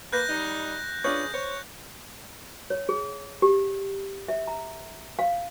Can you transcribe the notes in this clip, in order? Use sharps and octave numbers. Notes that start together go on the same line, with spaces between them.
A#3 B4 F#6 G6 A#6
G3 D#4
C#4 D4 F4 G#4 B4 C#5 G6
C5 C#5
C#5
G#4
G4
E5
A#5
F5